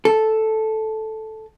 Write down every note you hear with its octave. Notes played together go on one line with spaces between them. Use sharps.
A4